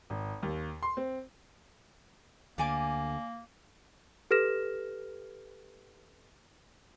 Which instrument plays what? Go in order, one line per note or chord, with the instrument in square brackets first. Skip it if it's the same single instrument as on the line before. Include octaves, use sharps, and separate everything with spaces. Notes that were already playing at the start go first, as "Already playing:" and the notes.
[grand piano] G#1
D#2
C6
C4
[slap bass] D2 D3 [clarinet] A#3 [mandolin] D5 G#5 D6
[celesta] G4 A4 B4 F6 A#6 E7